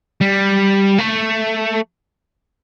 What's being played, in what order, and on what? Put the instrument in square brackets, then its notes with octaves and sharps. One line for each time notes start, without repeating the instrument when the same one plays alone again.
[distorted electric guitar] G3
A3